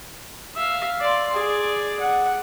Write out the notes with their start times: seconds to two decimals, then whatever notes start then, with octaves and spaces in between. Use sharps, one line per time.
0.56 E5 F5
1.00 D5 C6
1.33 G#4 D5
2.00 F#5